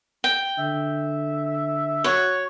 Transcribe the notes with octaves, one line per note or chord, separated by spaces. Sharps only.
G5
D3 E5
F#4 C#5